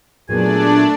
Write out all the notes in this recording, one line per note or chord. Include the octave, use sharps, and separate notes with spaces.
A#2 F#3 A3 B3 D4 G#4 D5 G#5